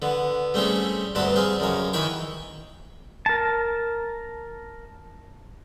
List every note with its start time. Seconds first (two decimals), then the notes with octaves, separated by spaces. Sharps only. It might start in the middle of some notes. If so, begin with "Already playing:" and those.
0.02 D3 B3
0.54 G3 A3 C4 C#4 G4 G#4
1.15 D2 G2 B3 C4 B4 A5
1.36 G3 C4 G#4 F5
1.60 F#2 C#3 A#3 C#5
1.93 D#3 E3 B4 C#5 G5 C#6
3.26 A#4 A5